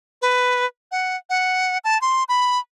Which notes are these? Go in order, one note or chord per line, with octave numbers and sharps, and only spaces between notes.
B4
F#5
F#5
A5
C6
B5